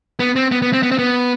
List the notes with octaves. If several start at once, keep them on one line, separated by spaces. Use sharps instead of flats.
B3
C4
B3
B3
C4
B3
C4
B3